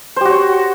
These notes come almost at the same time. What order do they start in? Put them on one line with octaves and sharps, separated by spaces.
C5 G4 F#4 C#5